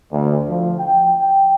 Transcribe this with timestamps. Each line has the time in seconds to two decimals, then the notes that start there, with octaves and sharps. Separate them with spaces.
0.12 D2
0.48 F3
0.79 G5
1.20 G5